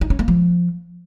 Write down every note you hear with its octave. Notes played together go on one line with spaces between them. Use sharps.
D#4
C#4
A#3
F3